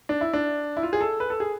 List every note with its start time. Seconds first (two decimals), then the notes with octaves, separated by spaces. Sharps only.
0.09 D4
0.21 E4
0.33 D4
0.77 E4
0.83 F4
0.93 G#4
1.01 A4
1.20 B4
1.30 A4
1.40 G#4